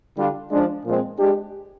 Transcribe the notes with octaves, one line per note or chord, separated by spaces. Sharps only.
D3 G3 D4 F4
F3 G#3 D4
A#2 F3 G#3 C4
G#3 D4 G4